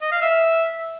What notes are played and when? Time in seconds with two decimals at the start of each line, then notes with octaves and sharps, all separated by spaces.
0.02 D#5
0.12 F5
0.22 E5